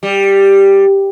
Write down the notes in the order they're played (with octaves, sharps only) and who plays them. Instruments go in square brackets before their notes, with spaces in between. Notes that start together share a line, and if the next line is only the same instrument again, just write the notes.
[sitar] G3